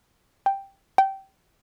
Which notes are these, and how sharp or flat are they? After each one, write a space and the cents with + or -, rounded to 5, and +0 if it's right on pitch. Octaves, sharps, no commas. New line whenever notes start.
G5 +0
G5 -20